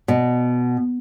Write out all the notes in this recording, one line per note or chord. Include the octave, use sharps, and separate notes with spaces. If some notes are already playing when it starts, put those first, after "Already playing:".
B2